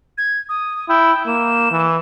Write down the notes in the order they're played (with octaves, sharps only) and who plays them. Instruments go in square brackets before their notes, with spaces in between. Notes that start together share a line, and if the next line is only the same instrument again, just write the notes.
[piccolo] G#6
D#6
[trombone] E4 [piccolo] G5
[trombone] A#3 [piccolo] E7
[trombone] E3